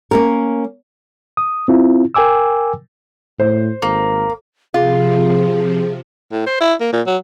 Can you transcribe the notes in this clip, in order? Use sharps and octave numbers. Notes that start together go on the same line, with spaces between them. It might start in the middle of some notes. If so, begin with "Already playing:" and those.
A#3 C#4 A#4
D#6
C4 E4 F4
A#4 G5 G#5 D6 E6
A2 C5
G#1 A#3
C3 F3 F4 G#4
A2
C5
E4
A#3
A#2
F#3